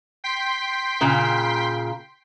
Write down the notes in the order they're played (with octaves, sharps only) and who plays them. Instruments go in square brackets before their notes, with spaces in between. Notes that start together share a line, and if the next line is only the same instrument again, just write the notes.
[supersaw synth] G5 C6 B6
[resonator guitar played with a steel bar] A#2 C#3